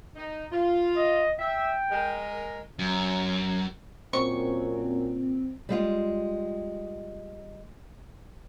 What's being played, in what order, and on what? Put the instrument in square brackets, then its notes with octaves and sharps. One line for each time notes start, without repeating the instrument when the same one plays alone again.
[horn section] D#4
F4
[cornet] D#5
[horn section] E5 [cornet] G5
[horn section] G#3 A#4
[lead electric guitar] F#2
[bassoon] F#2 [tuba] A#2 [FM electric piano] C4 [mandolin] C#6
[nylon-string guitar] G3 G#3 F4